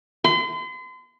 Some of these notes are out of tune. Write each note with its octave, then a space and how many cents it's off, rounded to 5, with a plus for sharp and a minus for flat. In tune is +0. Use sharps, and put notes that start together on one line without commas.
C6 -40